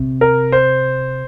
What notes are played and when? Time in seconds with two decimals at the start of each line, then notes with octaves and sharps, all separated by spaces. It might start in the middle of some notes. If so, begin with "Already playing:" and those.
Already playing: C3
0.21 A#4
0.52 C5